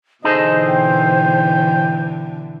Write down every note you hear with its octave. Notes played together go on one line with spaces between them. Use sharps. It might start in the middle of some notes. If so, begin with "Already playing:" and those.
B2 D3 E3 D#4 G#4 A4 C5 D#5
G5